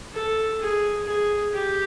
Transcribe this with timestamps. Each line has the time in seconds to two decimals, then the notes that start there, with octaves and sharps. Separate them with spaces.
0.13 A4
0.60 G#4
1.07 G#4
1.53 G4